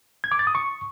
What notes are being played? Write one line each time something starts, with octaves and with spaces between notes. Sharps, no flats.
G#6
D6
A6
D#6
C#6